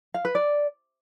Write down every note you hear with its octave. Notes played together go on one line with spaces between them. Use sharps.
F5
B4
D5